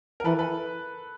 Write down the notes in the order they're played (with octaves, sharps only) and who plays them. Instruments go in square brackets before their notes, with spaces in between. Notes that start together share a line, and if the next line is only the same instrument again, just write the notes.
[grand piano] A#4
[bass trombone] E3 [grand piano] A4 B4
[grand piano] A4 B4